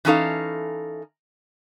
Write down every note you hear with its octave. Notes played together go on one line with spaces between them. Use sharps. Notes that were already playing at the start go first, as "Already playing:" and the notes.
E3 C#4 D#4 A4 F5